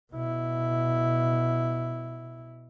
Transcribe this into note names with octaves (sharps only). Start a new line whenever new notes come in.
B2 E4